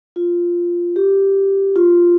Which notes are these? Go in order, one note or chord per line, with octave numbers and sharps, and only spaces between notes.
F4
G4
F4